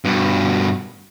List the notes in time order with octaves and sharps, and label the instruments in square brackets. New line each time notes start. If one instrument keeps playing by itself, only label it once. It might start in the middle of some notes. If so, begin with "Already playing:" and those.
[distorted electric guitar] G2 B2